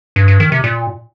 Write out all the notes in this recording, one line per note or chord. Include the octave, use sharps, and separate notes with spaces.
G2
G2
D#3
C3
A#2